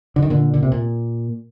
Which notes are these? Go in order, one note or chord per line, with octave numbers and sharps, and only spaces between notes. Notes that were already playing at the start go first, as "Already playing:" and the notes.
D3
D#3
A#2 D3
D3
C3
A#2